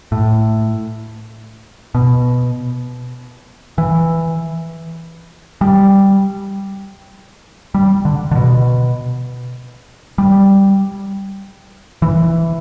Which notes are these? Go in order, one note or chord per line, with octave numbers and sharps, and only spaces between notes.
A2
B2
E3
G3
G3
D3
D3
B2
G3
E3